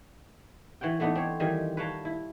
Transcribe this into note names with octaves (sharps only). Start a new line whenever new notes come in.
E3 C#5 F#5 G5
E3 A3 B3 D4 D#4
C4 C#5
D#3 E3 G3 D#4 F4 G#5
B4 C#5 F5 G5 A5 A#5
E4